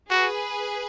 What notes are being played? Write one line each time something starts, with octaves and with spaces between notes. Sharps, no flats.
F#4 G#4 B4